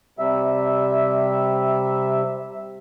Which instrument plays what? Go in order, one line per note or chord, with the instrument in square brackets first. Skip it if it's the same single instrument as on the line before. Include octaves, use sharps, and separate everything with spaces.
[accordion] C3 G3 E5